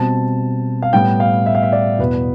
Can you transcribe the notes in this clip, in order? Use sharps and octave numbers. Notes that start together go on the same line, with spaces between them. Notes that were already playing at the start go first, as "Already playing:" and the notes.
Already playing: B2 G3 C4 A5
F5
A2 G3 B3 G5
F5
E5
F5
E5
D5
E2 B2 B3 B4